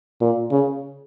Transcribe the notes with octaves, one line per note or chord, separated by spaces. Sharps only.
A#2
C#3